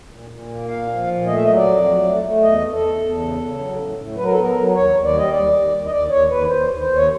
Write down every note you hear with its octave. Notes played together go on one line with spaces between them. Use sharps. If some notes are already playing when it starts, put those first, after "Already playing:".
A#2
A#2
A#3
A#2 F5
F3
A#2
A3 D#5
E5
F#3 D#5
D5
F2
F#3
A3
A3
E2 D#5
E2
A4
E2
E2
C#3
C#3
F#3
A2
A2
F#3 B4
A#4
A4
B3 A#4
F#3
D#2 C#5
D#2
D5
G3 D#5
D#2 D5
D#2
D#2
D#5
D#2 D5
D#2 C#5
D#2 B4
D#2 C5
D#2
C5
D#2
C#5